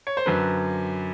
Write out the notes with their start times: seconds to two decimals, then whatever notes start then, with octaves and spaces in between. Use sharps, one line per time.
0.07 C#5
0.17 C5
0.26 F#2 D3 F#3 B4